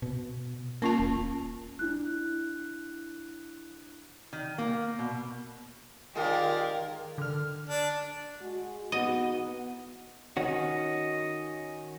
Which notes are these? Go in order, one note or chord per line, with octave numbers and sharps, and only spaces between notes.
B2
A#3 C#4 F4 A5
D#1
D4 E4 F#6
D#3
A#3
B2
D#3 G#3 F4 G4 A#4 D5
D3 F6
D4
G#3 F#4
E2 B3 D#4 F#4 D#5 F#5
D#3 C#4 F#4 D#5